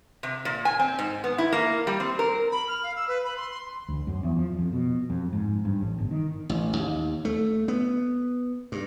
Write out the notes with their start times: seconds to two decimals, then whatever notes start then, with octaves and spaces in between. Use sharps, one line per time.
0.23 C3
0.45 A#2
0.65 G#5
0.79 C4
0.99 G#2
1.24 B3
1.38 E4
1.52 A#3
1.87 G3
2.00 C4
2.19 A#4
2.52 B5
2.68 F6
2.83 F5
2.96 E6
3.08 B4
3.24 B5
3.37 C6
3.51 C6
3.88 D2
4.07 F#2
4.23 E2
4.36 F3
4.59 F2
4.73 B2
5.10 F2
5.33 G#2
5.65 G2
5.81 A1
5.98 G1
6.11 D#3
6.49 A1
6.77 D#2
7.25 A3
7.68 B3
8.72 G2